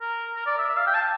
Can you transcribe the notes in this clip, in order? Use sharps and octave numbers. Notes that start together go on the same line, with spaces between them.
A#4
A#4
D5
E5
E5
F5
G5
A5